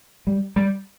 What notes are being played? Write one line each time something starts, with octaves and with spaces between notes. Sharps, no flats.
G3
G3